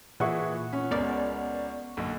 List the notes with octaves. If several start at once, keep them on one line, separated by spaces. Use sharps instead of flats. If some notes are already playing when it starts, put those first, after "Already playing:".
A#2 E3 E4 G#4 F#5 C#6
C#4
C#2 B3 A#4 D5
B1 D3 A#3